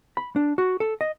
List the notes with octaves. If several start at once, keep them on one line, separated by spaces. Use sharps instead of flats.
B5
D4
F#4
A4
D#5